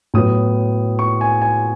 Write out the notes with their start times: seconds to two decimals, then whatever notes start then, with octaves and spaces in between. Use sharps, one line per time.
0.14 A2 F#3 B3 D#6
0.99 C#6
1.21 G#5
1.42 G#5